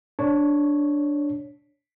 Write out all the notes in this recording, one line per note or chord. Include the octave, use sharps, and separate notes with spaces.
D4 C#5